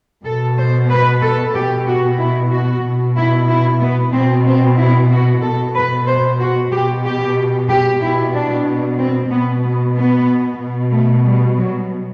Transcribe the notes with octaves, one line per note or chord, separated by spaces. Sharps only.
B2 A4
C5
B4
A4
B2 G4
F#4
E4
F#4
B2
E4
E4
B3
B2 C4
C4
E4
F#4
B2 A4
B4
C5
F#4
B2 G4
G4
G4
B2 E4
D4
C4
B2 B3
B3
B3
B2
A3
G3
F#3